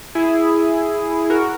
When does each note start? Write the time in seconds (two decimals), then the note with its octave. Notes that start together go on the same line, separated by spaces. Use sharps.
0.15 E4 G#4
1.30 F#4 A#4